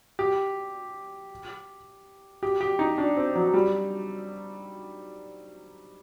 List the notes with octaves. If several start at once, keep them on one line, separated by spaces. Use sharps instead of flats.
G4
G4
G4
D#4
D4
C4
F#3
G3